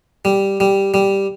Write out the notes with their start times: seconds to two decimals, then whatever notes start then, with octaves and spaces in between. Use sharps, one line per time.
0.25 G3
0.60 G3
0.94 G3